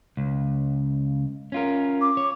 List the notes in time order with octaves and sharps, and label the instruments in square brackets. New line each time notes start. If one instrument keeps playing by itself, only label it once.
[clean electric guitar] C#2
C#4 F4 A#4
[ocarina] D6
[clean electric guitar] C#5